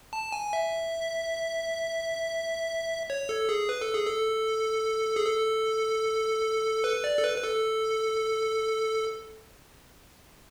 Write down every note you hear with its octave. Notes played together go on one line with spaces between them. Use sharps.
A5
G#5
E5
C#5
A4
G#4
B4
A4
G#4
A4
G#4
A4
B4
D5
A4
B4
B4
A4